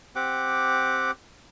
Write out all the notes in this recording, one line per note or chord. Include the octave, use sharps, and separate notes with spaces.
C4 G4 F#5 D6